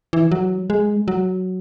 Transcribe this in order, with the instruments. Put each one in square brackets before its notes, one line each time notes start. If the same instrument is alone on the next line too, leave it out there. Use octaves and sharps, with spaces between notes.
[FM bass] E3
F#3
G#3
F#3